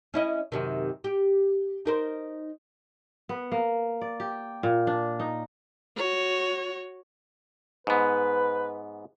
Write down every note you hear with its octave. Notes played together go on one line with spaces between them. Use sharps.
C#4 E4 D#5
F#2 C3 D#3
G4
D#4 A#4 C5
B3
A#3
D5
G4
A#2
D4
D#4
F#4 C#5
G#2 B3 B4